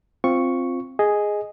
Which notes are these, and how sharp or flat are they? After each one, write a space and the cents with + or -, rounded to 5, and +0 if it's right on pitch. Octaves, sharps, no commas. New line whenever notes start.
C4 +0 F4 +0 C#6 +0
G#4 +0 D#5 +0